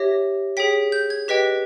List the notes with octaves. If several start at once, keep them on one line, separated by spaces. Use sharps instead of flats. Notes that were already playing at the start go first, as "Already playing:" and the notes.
Already playing: G4 C#5 E5 A#6
G#4 C#5 G5 B6
G6
G#6
G4 B4 D#5 G5 B6